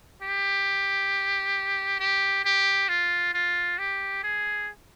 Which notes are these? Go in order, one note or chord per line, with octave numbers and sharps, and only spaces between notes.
G4
G4
G4
F4
F4
G4
G#4